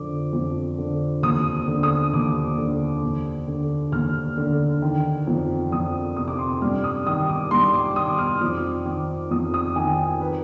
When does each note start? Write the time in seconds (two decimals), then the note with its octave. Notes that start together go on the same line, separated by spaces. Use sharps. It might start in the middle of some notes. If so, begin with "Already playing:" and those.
Already playing: F2 D3 D6
0.33 F2
0.78 D3
1.23 D#2 D#6
1.68 D3
1.83 D#6
2.13 D#2 D6
2.58 D3
3.03 D#2
3.48 D3
3.92 D#2 F6
4.37 D3
4.82 D#3
5.27 F2
5.72 F2 D#6
6.16 C3 D#6
6.28 D6
6.39 C6
6.49 D6
6.62 G2 F6
6.84 D#6
7.07 D#3 D#6
7.29 D6
7.51 G2 C6
7.74 D6
7.96 D#3 D#6
8.18 F6
8.41 F2 D#6
8.86 D#3 D6
9.31 F2 D#6
9.54 D#6
9.76 D#3 G#5
9.98 G5
10.21 B4